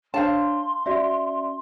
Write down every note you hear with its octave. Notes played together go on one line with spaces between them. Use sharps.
D4 C5 C#5 F5 A5 C6
C#4 F#4 D5 E5